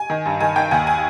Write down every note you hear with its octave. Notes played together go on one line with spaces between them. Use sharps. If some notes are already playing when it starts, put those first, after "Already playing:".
Already playing: G#5
D#3
G2
D#3 G#5
D#3 G5
D#2 G#5
G#5